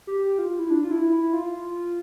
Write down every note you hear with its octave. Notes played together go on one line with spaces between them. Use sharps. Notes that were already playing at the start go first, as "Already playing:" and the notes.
G4
F4
E4
D4
F4
E4
E4
F4